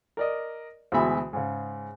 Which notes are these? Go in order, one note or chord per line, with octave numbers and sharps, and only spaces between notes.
A#4 D5 D#5
D2 B2 E3 G#3 E5 B5
G#2 C#3